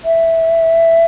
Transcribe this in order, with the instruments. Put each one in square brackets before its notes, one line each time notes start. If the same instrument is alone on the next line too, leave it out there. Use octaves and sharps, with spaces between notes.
[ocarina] E5